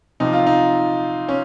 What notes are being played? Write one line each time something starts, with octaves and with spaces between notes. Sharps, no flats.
C3 F3 C4 D#4
F4
D#4
C#4